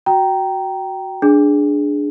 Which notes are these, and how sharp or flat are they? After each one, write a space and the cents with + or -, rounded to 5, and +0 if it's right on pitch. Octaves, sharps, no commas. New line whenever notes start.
F#4 +0 G5 -15 A#5 +5
D4 +0 G#4 +0